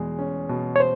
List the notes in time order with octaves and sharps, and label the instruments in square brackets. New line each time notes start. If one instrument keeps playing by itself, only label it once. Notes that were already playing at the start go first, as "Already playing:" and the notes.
Already playing: [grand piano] E2 B2 G#3
C#4
B2
[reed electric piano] C#5
C5